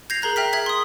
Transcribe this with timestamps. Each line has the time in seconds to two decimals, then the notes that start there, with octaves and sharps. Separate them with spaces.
0.10 G6 G#6 A#6 C7 F7
0.22 G#4 A#4 A#5 F#6
0.36 E5 G5 F6 B6
0.53 G#4 E5 G#6 B6
0.66 C6 D#6